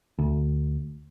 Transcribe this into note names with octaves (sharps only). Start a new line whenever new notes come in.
D2